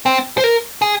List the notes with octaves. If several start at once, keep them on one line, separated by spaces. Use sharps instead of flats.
C4
C5
A#4
G#4